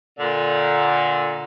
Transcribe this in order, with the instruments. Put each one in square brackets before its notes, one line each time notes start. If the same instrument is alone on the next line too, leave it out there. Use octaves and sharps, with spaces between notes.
[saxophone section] A#2 D3